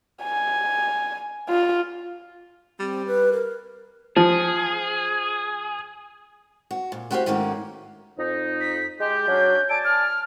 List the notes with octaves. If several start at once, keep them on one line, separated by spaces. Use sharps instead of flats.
G#5
F4
G3 C4
B4
A#4
F3 G#4
F#4
A#2
A3 F#4 G4 C5 D#5 F5
G#2 D#3 A3 A#3 C#4 F#4
F2 D#4
B6
G#3 G4 G6
F#3 C#4 D4
D5 G#5 A5 D7
F6